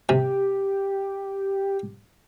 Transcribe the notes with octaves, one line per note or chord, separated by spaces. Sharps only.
C3 G4